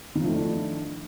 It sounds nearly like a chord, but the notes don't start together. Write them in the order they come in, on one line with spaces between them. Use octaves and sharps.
D#3 F3 A3 E4 D4